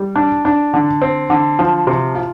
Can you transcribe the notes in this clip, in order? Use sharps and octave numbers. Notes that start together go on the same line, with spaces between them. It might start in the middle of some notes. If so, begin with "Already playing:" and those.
Already playing: G3
D4
D4
D3
C4
D3
F3
C3
F4